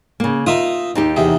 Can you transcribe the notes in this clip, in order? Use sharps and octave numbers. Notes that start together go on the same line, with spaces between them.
C#3 A#3
D#4 F4 E5 D#6
D#2 D#4 G4
E2 C3 G#4